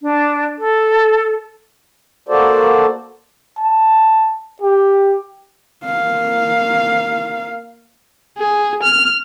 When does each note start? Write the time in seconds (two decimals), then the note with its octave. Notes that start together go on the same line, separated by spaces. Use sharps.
0.01 D4
0.58 A4
2.29 A#3 F#4 A4 C5 D5
3.58 A5
4.62 G4
5.85 A#3 F5
8.39 G#4
8.83 F6